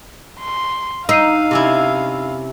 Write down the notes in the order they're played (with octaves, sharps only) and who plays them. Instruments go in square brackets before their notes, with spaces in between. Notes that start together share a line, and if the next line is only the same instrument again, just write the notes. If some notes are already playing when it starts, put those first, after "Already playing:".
[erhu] C6
[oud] D#4 [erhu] F5 [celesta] E6 C7 D#7
[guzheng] C3 C#4 E4